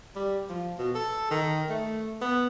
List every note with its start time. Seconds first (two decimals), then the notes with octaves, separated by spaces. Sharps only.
0.16 G3
0.49 F3
0.78 B2
0.95 A4
1.31 D#3
1.69 A3
2.22 B3